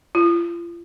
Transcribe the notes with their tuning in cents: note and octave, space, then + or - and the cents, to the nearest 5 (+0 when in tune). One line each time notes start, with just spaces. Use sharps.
F4 -40